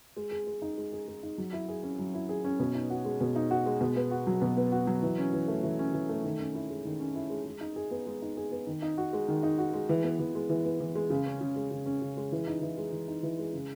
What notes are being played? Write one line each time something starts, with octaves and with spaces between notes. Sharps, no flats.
G#3
G#4
G#3
D#4
G#3
G#4
G#3
D#4
F#3
E4
G#4
C#4
F#3
E4
G#4
C#4
B2
D#4
F#4
G#3
B2
D#4
F#4
G#3
B2
B3
F#4
F#3
B2
B3
F#4
F#3
E3
C#4
E3
A3
E3
C#4
E3
A3
D#3
C#4
E4
G#3
D#3
C#4
E4
G#3
G#3
D#4
G#4
B3
G#3
D#4
G#4
B3
D#3
D#4
F#4
G#3
D#3
D#4
F#4
G#3
E3
B3
E3
G#3
E3
B3
E3
G#3
C#3
C#4
C#3
G#3
C#3
C#4
C#3
G#3
E3
D#4
E3
G#3
E3
D#4
E3
G#3
C#3